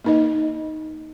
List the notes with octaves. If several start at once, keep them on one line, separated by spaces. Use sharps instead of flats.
A#3 D#4 D#5